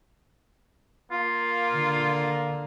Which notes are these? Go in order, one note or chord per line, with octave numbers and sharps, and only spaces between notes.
A#3 F4
D3